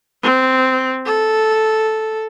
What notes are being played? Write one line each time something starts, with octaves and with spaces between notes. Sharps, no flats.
C4
A4